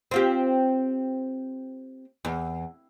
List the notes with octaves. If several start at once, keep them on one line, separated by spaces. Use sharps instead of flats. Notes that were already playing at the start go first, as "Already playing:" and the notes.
C4 F4 G4
E2